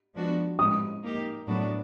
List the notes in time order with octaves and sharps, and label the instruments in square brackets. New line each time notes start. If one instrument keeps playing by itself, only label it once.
[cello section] F3 G#3 B3 D4 F#4
[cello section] A2 F3 G#3 B3 [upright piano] D#6
[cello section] A#3 D#4 G4
A2 F#3 B3 D4 F#4